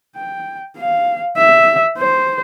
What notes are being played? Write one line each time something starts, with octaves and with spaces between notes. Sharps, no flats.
G5
F5
E5
C5